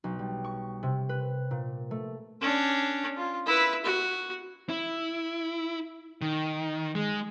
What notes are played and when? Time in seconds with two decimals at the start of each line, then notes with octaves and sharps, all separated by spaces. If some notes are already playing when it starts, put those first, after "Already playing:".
0.04 B1
0.19 G3
0.44 C#6
0.83 C3
1.09 B4
1.51 A#2
1.91 A3
2.41 C#4 D4
3.17 F4
3.46 E4 B4
3.85 F#4
4.69 E4
6.22 D#3
6.95 G#3